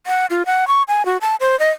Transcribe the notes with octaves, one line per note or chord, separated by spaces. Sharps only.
F#5
F4
F#5
C#6
G#5
F#4
A5
C5
D#5